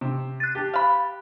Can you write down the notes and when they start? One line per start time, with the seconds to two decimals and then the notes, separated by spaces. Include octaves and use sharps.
0.01 C3
0.40 F#6 A6
0.55 G4 A5
0.74 F5 B5